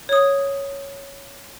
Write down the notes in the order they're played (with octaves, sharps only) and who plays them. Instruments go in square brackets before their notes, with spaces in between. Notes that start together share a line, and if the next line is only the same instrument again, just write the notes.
[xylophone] C#5 D#6